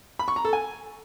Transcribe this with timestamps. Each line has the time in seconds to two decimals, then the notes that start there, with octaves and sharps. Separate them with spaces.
0.19 B5
0.28 C#6
0.36 A#5
0.45 A4
0.53 G#5